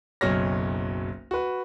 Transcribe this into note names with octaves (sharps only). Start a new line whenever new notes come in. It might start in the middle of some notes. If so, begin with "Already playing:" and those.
F#1 B1 F#3 C#5 F6 A#6
F#4 B4